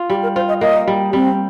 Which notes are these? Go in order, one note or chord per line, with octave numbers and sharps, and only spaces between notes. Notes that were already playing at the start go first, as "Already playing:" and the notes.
Already playing: F4
G3 G4
A#4
F4 C5
D#5
A#3 D#5
G3
G3 C4